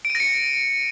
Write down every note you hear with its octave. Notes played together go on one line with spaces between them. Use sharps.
D7
D#7
A#6
C#7